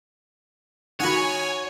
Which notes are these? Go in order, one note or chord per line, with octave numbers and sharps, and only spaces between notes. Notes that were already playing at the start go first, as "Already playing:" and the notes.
D#3 F#4 C#5 F#5 G#5 B5